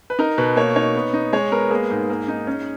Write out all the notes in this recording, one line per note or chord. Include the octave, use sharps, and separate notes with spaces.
B4
D#4 A#4
B2 B4
A#3 C#5
D#4 C#5
B3
D#4
G#3 C#5
B3 A#4
A#3 G#4
G#2
A#3
D#4
C#4